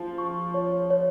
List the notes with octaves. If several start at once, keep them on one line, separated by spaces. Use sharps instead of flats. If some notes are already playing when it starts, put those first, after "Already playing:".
Already playing: F3
C#6
C#5
C#5